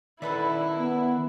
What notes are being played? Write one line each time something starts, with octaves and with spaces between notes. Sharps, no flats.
D#3 E4 A4 B4 D5 E5
B3